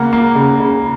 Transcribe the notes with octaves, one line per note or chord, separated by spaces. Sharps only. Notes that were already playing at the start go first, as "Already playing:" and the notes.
Already playing: C#3 A#3 F#5
A#3
C#3
C#3